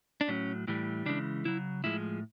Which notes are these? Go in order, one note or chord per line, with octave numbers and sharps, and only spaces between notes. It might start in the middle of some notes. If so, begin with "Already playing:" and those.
D4
A2 F#3 C#4
A2 E3 G3
C#3 E3 G#3 D4
C#3 F#3 E4
A2 F3 G#3 E4